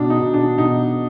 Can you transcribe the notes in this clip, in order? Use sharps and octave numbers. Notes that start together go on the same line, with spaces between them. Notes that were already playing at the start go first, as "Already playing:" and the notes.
Already playing: B2 D4
D#4
B2
D4
B2 D#4